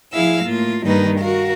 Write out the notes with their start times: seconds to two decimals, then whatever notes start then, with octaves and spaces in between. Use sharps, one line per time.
0.13 F3 E4 G#4 F5 E6
0.44 A2 A#3 F4
0.84 G2 D#3 G3 A#3 D#4 B4
1.19 F#4 A#4 F5